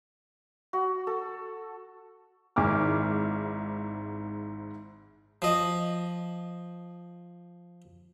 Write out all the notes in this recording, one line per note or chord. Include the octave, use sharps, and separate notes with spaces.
F#4
A4
G#1 G#2 E4 D6 F6
F3 D#5